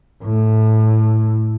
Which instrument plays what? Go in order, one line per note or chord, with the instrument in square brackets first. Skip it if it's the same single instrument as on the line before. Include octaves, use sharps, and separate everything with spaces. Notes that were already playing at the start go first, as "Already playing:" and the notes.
[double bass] A2